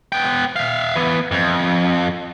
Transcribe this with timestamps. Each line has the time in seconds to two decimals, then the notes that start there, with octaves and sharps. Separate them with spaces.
0.12 B3 G5
0.56 E5 F5
0.96 E3 B3
1.31 F2